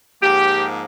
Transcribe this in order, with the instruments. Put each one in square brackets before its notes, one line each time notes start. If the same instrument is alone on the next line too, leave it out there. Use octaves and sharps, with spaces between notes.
[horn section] G#2 F3 A#3 G4